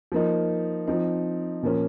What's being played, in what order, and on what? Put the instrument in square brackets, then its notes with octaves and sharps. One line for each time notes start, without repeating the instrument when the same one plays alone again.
[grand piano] F3 A#3 D#4
F3 C4 D#4
A#2 F3 A#3 C#4